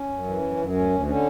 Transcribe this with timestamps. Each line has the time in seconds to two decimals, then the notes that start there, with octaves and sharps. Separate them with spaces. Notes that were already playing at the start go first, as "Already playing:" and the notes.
Already playing: C#4
0.10 F#2
0.26 E3
0.42 F#2
0.57 F#2
0.74 D2 C#4
0.90 D2
1.07 D3 C#4